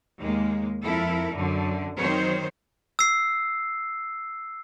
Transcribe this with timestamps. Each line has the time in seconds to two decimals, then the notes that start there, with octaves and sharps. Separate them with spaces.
0.20 D#2 G#3 A#3
0.82 F2 E4 A4 A#4
1.33 F#2 D3
1.96 D#3 F#3 C4 C5 C#5
2.99 E6 C7